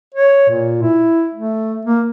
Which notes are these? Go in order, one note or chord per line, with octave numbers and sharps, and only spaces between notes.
C#5
A#2
E4
A3
A#3